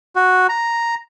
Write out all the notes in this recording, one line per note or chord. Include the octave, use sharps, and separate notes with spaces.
F#4
A#5